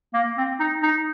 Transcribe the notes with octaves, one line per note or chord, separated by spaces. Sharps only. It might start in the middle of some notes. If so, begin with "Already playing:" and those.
A#3
C4
D#4
D#4